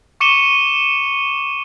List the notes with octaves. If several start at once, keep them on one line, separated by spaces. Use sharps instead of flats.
C#6 D6 C#7 D#7 E7 G7